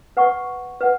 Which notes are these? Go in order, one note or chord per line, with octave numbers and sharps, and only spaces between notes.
B4 F#5 C#6
B4 F#5